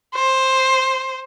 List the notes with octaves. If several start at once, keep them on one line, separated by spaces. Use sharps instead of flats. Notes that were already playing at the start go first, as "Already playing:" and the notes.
C5